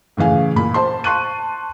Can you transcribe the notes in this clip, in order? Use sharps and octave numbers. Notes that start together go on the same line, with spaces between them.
A2 C#3 E3 F5 G#5
A#2 B5
C5 A5 C6
A5 C6 C#6 F#6 D#7